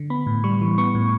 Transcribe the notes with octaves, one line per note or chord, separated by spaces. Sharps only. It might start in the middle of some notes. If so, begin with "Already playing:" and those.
Already playing: D3
B3 B5
A2
G3 C#6
E3
B3 C#6
A2